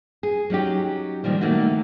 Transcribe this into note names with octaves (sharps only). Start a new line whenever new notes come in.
G#4
F#3 C#4 D#4 G4
A#2 D#3 F3 G3
D#3 A3 A#3 C4 D#4 F#4